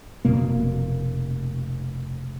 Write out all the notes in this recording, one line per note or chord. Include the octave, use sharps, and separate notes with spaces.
F1 B2 A#3